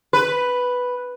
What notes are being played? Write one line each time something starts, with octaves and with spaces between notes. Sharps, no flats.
B4